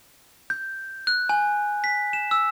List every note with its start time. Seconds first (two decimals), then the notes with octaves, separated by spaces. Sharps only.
0.50 G6
1.07 F#6
1.29 G#5
1.84 B6
2.13 E7
2.31 E6